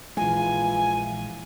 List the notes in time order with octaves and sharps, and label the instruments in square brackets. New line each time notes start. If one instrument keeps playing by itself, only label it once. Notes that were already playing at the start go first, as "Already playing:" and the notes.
[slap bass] A#1 G#3 [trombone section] E3 F4 [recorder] G#5